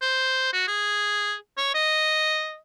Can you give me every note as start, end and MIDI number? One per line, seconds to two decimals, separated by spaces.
0.02 0.49 72
0.53 0.65 66
0.68 1.34 68
1.57 1.75 73
1.75 2.57 75